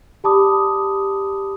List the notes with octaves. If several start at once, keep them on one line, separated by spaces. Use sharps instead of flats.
G4 D5 A5 B5 D6 D#6